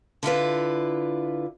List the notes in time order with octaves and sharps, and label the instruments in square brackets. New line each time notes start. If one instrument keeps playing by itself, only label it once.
[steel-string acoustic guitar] D3 E4 F4 B4